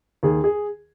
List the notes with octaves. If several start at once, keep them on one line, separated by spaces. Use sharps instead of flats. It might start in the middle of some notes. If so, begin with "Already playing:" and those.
D#2 G#4
G#4